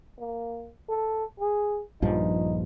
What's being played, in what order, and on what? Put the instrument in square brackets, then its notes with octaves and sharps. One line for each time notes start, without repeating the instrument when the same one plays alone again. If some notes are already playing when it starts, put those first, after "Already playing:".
[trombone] A#3
A4
G#4
[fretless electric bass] A#1 G2 F3 [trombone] D#4